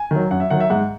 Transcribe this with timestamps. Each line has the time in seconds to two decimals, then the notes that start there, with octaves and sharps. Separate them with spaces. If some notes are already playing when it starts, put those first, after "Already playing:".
Already playing: G#5
0.11 D#3 F#3
0.31 F#2 F#5
0.40 E5
0.50 D#3 F#3 F#5
0.60 E5
0.70 G#2 F#5